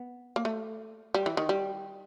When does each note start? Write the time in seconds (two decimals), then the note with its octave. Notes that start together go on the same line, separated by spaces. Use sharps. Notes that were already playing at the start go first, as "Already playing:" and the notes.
Already playing: B3
0.36 A#3
0.45 A3
1.14 G3
1.26 E3
1.37 D#3
1.49 G3